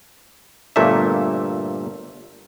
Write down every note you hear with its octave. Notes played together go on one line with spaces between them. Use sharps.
G1 A#2 A3 A#3 E5